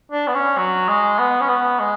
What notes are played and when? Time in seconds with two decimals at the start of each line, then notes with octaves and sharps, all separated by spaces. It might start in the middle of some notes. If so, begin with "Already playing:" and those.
0.12 D4
0.27 B3
0.34 C#4
0.58 F#3
0.89 G#3
1.19 B3
1.41 C#4
1.49 B3
1.80 G#3